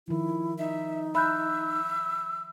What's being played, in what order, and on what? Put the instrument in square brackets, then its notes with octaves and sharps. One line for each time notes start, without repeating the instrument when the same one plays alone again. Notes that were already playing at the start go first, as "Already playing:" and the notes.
[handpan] D#3 F3 [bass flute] E4
[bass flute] D#4 [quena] E5
[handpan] E5 [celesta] B5 F#6 G6 [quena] E6